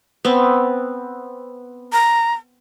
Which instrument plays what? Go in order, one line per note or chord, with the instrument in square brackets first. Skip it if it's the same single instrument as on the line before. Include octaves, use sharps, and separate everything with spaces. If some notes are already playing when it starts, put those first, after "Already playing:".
[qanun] B3 C4
[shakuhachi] A#5